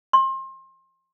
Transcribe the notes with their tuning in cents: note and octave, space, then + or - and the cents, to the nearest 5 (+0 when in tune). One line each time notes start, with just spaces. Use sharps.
C6 +30